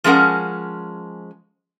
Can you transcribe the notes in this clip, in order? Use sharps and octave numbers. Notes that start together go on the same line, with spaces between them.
F3 G#3 C#4 A#4 F#5